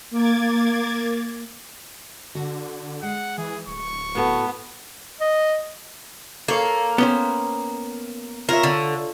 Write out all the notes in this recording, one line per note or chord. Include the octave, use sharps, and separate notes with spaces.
A#3 D6 G#6 A6
D3 F#4
G#3 F#5
E3 G#4
D1 C#6
A2 B3 F#4 A4
D#5
A#3 A4 C#5 F5
B3 C#4 C5 G5
F4 A#4 C#5 E5
D3